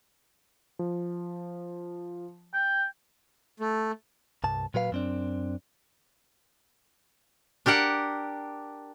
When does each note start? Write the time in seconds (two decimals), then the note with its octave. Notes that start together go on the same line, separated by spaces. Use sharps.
0.79 F3
2.53 G5
3.60 A3
4.44 C2 G2 A5
4.74 A#2 F#3 B4 F5
4.92 F#2 C4 D4
7.66 D4 G4 A#4 F#5